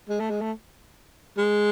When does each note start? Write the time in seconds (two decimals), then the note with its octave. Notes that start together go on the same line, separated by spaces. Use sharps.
0.09 G#3
0.20 A3
0.30 G#3
0.41 A3
1.38 G#3